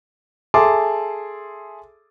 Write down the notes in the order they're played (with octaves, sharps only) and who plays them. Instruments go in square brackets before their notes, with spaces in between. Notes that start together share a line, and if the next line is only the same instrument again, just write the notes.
[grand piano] G#4 A4 E5 A5 C6 D6